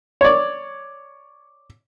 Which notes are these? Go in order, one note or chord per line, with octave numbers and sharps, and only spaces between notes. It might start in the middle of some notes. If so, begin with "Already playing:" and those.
C#5 D5